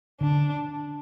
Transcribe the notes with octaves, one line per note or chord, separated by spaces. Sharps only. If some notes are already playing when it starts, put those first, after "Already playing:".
D3 D4